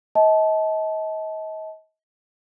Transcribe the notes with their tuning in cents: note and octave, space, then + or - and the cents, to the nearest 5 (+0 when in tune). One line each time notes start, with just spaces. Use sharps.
D#5 +35 A5 -20